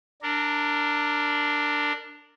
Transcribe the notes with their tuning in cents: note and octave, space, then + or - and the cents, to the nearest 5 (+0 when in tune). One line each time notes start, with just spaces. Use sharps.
D4 +0 A#4 -25